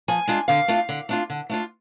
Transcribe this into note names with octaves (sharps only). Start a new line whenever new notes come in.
F3 G#5
G#3 D4 F4
D3 F5
A3 D4 F4
D3
A3 D4 F4
D3
A3 D4 F4